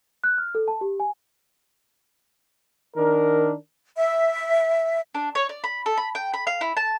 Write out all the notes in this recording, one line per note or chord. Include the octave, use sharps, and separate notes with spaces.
F#6
F6
A4
A5
G4
G#5
D#3 D4 A#4
E5
D4
C#5
D5
B5
A4
B5
G5
B5
F5
E4
A5